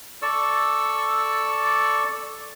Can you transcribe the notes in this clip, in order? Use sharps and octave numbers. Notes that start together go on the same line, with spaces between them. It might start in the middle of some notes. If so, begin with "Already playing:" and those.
A4 D5 C#6 E6